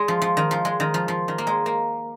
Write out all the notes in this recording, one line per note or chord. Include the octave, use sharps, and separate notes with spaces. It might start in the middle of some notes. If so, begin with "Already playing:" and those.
Already playing: G#3
F3
F3
D#3
F3
G#3
D#3
F3
F3
D#3
A#3
G#3
A#3